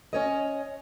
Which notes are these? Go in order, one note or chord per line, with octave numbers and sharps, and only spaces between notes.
C#4 C#5 D#5